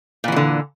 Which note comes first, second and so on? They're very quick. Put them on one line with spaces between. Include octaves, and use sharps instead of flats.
A#2 E3 F#3 D3